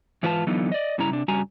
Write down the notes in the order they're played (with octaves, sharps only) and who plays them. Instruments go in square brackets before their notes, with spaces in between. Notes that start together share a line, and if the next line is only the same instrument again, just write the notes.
[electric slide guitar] G#2 E3 F4 B4 F5 A5
D3 E3 F#3 B3 D#4 F4
D5 D#5
G2 C#3 G3 E4 A#5
C3 D4
G2 C#3 G3 F#4 G#5 A#5